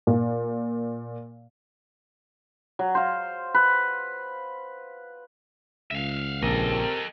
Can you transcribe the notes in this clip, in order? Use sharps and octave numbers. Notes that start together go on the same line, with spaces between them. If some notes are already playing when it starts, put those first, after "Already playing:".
A#2
F#3
C5 F5
B4
C#2 E5 F5
A#1 C4 G4 A4 A#4 D#5